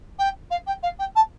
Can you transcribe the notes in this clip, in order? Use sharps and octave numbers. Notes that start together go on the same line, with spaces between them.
G5
F5
G5
F5
G5
A5